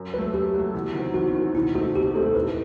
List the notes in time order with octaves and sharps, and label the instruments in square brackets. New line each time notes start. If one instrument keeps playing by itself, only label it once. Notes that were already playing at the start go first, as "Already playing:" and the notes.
Already playing: [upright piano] F#2
[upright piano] F#3 A3 [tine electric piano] B4
[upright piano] F#2 [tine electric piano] G4
[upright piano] F#3 A3
E2
D#3 F#3 C4
[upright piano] E2 [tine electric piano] F#4
[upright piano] D#3 F#3 C4
[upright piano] B2 [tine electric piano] E4
[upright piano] A3 C4 D#4 [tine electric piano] F#4
[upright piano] B2 [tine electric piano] G4
[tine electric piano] G4
[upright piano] A3 C4 D#4 [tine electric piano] A4
[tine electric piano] A4
[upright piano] A2 [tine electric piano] B4